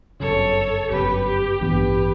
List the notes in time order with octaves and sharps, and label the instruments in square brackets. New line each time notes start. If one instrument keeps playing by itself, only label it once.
[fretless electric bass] G1 F#2 C#3 [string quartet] A4 C#5
[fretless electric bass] G1 F#2 C#3 [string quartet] G4 B4
[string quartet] G4
[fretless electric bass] A1 G2 E3 B3 [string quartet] G4 B4